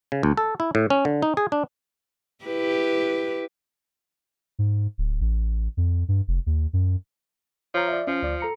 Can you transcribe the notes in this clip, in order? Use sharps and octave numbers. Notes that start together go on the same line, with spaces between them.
C#3
D2
A4
E4
A2
C#4
D3
D#4
G#4
D4
E4 G4 B4
G#2
D1
A1
F2
G2
F1
D#2
F#2
F3 C#5 A#5
D5 E5
F3 C#4
D2 D5
A4 A#5 C#7